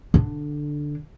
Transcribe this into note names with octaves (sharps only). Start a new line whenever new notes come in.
D3 D4